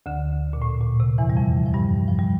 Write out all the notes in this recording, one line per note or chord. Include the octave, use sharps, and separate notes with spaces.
D2 D3
A#2
A2
A#2
C3
E2 E3
G3
F2 F3
F3
G2 G3
F3
G3